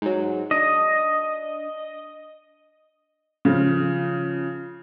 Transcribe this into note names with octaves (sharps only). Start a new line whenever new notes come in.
G#2 F#3
D4 D#5
C#3 F3